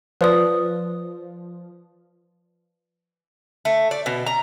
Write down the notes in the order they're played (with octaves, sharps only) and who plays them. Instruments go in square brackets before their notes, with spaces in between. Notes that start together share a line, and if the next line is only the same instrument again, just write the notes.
[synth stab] F3 [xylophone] B4 D5 D#6
[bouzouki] A3
D5
B2
A#5